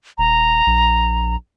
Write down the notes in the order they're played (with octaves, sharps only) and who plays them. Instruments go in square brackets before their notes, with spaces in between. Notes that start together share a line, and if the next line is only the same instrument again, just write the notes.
[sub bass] D#1 [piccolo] A#5
[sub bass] A#1